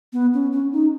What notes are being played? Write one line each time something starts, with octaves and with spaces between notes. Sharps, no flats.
B3
C#4
C#4
D#4